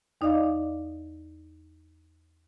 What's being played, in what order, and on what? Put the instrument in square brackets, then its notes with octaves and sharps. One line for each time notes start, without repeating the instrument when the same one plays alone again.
[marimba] E2 D#4 D5 D#5 F5 D6